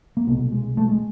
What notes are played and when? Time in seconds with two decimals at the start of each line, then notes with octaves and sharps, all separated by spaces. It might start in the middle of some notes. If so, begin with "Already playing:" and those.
0.17 A#3
0.27 C2 B2 B3
0.52 G#3
0.77 A3
0.89 G#3